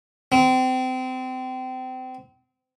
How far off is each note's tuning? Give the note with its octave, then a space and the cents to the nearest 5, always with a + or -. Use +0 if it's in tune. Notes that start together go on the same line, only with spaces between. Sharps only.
C4 -30